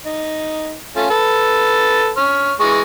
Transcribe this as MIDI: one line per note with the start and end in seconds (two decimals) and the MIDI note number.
0.06 0.74 63
0.96 1.06 57
0.96 1.06 61
0.96 1.06 65
1.10 2.11 69
1.10 2.11 71
2.17 2.54 73
2.17 2.54 89
2.60 2.81 52
2.60 2.81 56
2.60 2.81 85